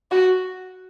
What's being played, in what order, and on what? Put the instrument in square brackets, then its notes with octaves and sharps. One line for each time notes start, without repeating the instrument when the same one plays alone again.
[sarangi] F#4